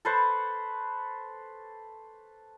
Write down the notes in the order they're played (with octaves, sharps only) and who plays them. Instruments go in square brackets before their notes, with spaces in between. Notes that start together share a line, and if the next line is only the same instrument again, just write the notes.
[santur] A4 B4 C5 C#6